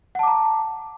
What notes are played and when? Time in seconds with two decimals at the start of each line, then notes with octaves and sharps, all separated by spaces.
0.15 F#5
0.19 A5
0.23 D6
0.27 A#5